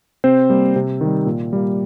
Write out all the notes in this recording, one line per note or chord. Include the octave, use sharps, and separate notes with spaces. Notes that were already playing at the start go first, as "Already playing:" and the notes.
C3 C4 C5
G3 A#3
C3
D#3
G3
A#2
G3 A#3